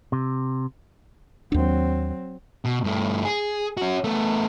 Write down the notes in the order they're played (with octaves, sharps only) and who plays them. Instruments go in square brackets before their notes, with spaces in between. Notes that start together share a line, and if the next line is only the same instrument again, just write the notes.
[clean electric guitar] C3
[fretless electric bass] D#2 D4 [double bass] F#3 C4
[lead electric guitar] B2
G2 A3
G#4
C#4 F#4
A3 B3